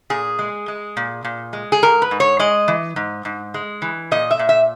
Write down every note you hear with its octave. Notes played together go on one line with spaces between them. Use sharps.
A#2 G#4
G#3
G#3
A#2
A#2
G#3
G#4
G#2 A#4
B4
G#2
C#5
G#3 D#5
E3
G#2
G#2
G#3
E3
A#2 D#5
E5
A#2
E5